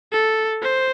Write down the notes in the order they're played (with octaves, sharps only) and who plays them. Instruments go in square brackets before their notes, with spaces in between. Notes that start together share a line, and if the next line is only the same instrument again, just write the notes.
[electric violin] A4
C5